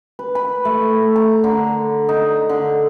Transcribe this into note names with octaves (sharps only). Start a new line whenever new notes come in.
B4
B5
A3
A#5
D3
D#4
D3